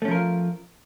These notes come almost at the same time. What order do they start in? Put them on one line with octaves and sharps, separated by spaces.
A3 C#4 F3 A#4 F4